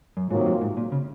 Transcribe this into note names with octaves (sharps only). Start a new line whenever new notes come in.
F#2
G#2 C3 D#3 F#3 A#3 F4
F#2
G#2
A#2
C#3